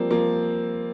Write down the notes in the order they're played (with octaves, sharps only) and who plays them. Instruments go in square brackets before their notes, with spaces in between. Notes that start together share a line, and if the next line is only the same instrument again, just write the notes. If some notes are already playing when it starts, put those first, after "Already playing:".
Already playing: [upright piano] F3 G3 A#3 C4
F3 A#3